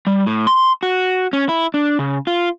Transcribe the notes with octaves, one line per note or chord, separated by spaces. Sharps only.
G3
A2
C6
F#4
C#4
E4
D4
C#3
F4